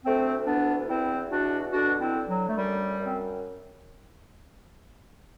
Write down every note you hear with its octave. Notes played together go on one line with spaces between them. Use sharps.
D2 A3 C4
E3 B3 D4
E2 C4 E4
B2 D4 F#4
D3 D4 F#4
C4 E4
D3
F#3
A3
F#2 G3
F#2
C4